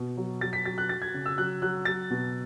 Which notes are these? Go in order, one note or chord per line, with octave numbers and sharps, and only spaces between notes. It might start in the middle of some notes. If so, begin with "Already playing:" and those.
Already playing: B2
F#3
F#3 A6
B6
F#3 A6
F#6
F#3 A6
G#6
C#3
E6
F#3 F#6
F#3 F#6
F#3 A6
B2